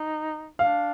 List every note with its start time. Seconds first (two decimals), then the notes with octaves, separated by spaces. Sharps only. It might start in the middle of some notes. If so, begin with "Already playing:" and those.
Already playing: D#4
0.59 D4 F5